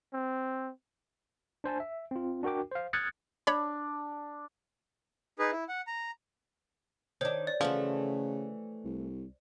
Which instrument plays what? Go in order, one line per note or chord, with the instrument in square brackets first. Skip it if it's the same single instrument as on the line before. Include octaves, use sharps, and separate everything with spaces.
[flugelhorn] C4
[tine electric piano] D4 C5 G#5 A5
E5
C4 F4
D4 F#4 A#4 G5 D6
C5 F5
D#6 F6 F#6 G#6 A6 C#7
[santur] D4 [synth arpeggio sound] C#5 B5
[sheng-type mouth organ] D#4 G#4 B4
E4
F#5
A#5
[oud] D#3 D4 [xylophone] C5 C#5
[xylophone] D5
[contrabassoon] C#3 [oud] E3 A3 F#4 [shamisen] F3
[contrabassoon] C2